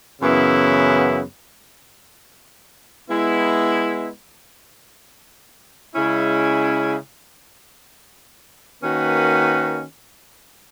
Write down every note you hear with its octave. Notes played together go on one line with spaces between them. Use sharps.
F#2 C#3 E3 B3 E4
G#3 B3 E4
C#3 G#3 C#4 E4
D#3 A#3 C#4 F#4 B4